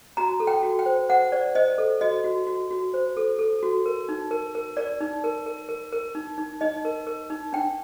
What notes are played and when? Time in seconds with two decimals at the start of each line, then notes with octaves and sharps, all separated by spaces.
0.17 F#4 A#5
0.40 A4
0.47 G5
0.63 F#4
0.79 G5
0.86 C5
1.09 C5 F#5
1.32 C5 D5
1.55 C5 D#5
1.78 A4
2.01 F#4 D#5
2.24 F#4
2.47 F#4
2.71 F#4
2.94 C5
3.17 A4
3.39 A4
3.63 F#4
3.86 A#4
4.09 D#4
4.31 A#4
4.55 A#4
4.77 A#4 D5
5.00 D#4
5.24 A#4
5.46 A#4
5.69 A#4
5.92 A#4
6.15 D#4
6.38 D#4
6.61 D#4 D#5
6.85 A#4
7.07 A#4
7.30 D#4
7.53 D4 G5